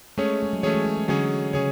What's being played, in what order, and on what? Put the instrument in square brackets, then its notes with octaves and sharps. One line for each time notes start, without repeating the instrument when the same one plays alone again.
[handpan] G#3 [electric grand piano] A3 C#4 G#4 C#5
[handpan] G#3
F#3
[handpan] E3 [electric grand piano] A3 C#4 G#4 C#5
[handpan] G#3
G#3
G#3
[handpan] D3 [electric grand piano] F#3 C#4 G#4 C#5
[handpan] C#3 [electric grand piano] C#4 G#4 C#5